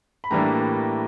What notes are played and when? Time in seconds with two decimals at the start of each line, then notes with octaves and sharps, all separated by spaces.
0.24 B5
0.31 A2 E3 G3 A#3 D4 A#5